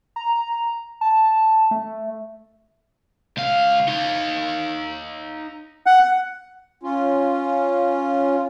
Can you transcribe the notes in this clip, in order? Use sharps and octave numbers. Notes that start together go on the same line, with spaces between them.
A#5
A5
A3
C#2 F5
D#4 F5
F#5
C#4 F4